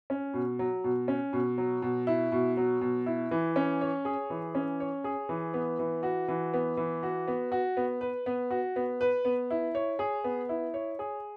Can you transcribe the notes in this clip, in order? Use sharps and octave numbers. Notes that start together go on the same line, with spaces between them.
C#4
B2
F#3
B2
C#4
B2
F#3
B2
E4
B2
F#3
B2
E4
E3
C#4
C#5
G#4
E3
C#4
C#5
G#4
E3
B3
E3
F#4
E3
B3
E3
F#4
B3
F#4
B3
B4
B3
F#4
B3
B4
B3
E4
C#5
G#4
B3
E4
C#5
G#4